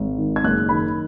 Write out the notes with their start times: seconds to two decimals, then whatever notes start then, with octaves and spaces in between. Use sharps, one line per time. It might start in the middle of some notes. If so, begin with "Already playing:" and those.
Already playing: G#1
0.18 D#3
0.36 G#6
0.44 F#1 F#6
0.69 D#3 B5